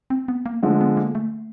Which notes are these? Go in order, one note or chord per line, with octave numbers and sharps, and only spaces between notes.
C4
B3
A#3
D3 F3 G#3 A3
B3
A#3
A3